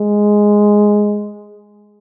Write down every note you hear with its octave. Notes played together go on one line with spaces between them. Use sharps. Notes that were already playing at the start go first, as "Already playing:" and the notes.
Already playing: G#3